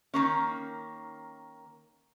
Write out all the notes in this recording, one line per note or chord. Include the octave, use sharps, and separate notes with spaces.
D#3 F#3 A#3 C#4